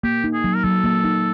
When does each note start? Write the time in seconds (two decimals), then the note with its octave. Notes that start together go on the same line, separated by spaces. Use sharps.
0.04 A#3 G4
0.24 D#4
0.34 G#4
0.44 F#3
0.55 A#4
0.64 F#3 A4
0.84 A#3
1.04 D#4